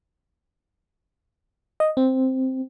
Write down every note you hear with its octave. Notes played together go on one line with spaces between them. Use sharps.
D#5
C4